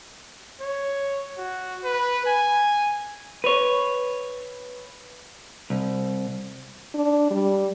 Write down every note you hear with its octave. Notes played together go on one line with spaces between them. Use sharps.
C#5
F#4
B4
G#5
B4 C#5
C2
D4
G3